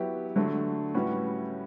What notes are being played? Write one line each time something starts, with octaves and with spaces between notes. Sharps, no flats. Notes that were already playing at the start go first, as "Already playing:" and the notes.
Already playing: F#3 B3 E4 G4
D3 F#3 A3
A2 G3 C#4 F#4 B4